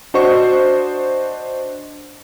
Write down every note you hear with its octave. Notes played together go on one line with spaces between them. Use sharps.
D4 F#4 C5 D#5 C#6